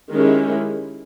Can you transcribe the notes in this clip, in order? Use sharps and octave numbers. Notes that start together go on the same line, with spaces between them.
D#3 G#3 C#4 E4 G4